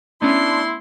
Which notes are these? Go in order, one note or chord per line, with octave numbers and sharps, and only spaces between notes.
A3 B3 C#4 D4 E4 C6